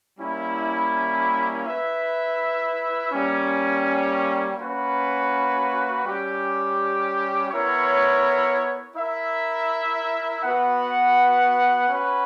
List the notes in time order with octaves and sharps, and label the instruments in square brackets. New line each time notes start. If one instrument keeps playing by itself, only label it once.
[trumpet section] G3 A#3 C#4 E4
E4 B4 E5
G3 A#3 C#4
A#3 C#4 F#4 B4
G3 C#4 G4
B3 E4 A#4 C#5
E4 A#4 E5
B3 F#4 B4 F#5
C#4 F#4 B4